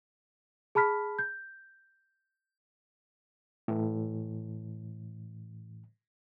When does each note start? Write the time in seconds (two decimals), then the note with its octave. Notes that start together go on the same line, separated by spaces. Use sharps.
0.75 G#4 A5 B5 F6 B6
1.19 G6
3.68 A2 E3